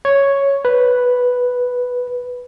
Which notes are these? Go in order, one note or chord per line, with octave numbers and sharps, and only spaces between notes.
C#5
B4